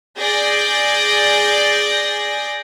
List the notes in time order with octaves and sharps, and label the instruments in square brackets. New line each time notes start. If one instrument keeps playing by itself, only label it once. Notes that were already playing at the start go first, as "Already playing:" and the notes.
[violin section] G#4 D5 G6 A6 A#6